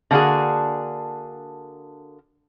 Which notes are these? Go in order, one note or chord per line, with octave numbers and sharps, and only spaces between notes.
D3 A#3 D4 F#4 G#4